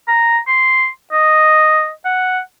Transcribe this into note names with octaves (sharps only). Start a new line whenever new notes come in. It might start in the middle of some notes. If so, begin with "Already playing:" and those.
A#5
C6
D#5
F#5